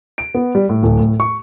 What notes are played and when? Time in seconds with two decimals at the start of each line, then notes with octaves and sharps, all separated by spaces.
0.18 D7
0.35 B3
0.55 G3
0.69 A2
0.83 D1
0.99 A2
1.20 C#6